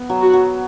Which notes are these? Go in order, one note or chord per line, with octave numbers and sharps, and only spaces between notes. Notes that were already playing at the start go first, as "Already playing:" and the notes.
Already playing: B3
F#3
F#4
F#3